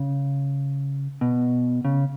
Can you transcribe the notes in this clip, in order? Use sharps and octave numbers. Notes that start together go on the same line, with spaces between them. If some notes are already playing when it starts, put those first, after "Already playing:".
Already playing: C#3
B2
C#3